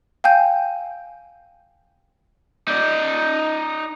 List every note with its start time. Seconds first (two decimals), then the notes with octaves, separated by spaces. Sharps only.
0.24 F5 G5 G#5 G6
2.68 D#4 D5